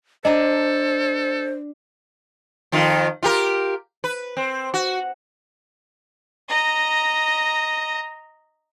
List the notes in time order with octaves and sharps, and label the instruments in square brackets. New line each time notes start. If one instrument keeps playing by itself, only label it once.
[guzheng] D4 G#5 A#5 [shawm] A4 [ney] C5 [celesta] D#5
[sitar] F2 D#3 F4
F4 G4 A#4
B4
C4
F#4
[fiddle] D#5 A#5